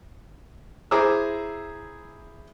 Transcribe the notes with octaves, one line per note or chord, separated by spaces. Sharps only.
E4 G#4 C5 A#5 D6 E6